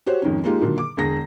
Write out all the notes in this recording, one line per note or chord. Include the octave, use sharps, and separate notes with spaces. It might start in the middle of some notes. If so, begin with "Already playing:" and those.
F#4 G4 C5 C#5
F2 G#2 D#3 C#4
G#3 A#3 D#4 F4 G4
A#2 D3 D#3 F#3
D6
E1 D3 G#4 A#6